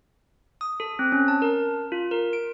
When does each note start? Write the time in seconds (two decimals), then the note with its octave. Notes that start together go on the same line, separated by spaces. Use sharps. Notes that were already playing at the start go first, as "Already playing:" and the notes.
0.61 D#6
0.80 A4
0.99 C4
1.12 C#4
1.28 A5
1.42 A#4
1.92 F4
2.11 A#4
2.33 D7